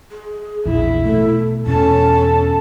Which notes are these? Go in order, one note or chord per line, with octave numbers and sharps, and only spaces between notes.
G#4
A#1 E2 E4
B2 A3 A4
E2 B2 C#4 A4 A5